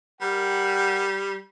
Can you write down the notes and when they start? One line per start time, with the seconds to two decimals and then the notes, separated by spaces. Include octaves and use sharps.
0.21 G3 A#4 F#5 G5